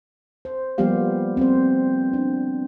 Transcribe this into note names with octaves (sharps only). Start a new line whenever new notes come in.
C5
F3 G3 A#3 B3 G4 F5
C4 C5
D4